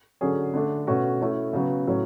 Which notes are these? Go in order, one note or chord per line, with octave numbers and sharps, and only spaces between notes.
D3 F#3 C#4 G#4
D3 A3 D4
B2 A3 C#4 F#4
A3 C#4 E4
C#3 F#3 B3
A2 F#3 C#4